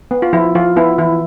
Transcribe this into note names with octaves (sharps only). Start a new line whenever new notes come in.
B3
F4
F3 E4
F3 F4
B3 E4
E3 E4